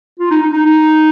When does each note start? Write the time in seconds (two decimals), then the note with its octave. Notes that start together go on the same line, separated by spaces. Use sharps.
0.19 F4
0.31 D#4
0.42 D#4
0.53 D#4
0.66 D#4